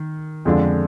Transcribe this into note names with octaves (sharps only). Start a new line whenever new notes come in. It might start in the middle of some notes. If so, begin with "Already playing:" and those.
Already playing: D#3
F2 D3 G#3 D4 F4